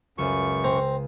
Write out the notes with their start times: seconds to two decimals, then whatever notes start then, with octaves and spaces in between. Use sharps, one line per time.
0.18 C#2 F#2 C#6
0.64 C4 A#5